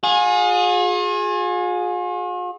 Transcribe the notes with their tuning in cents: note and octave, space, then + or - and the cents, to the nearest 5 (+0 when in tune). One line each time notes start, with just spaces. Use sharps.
F4 +45 G#4 +0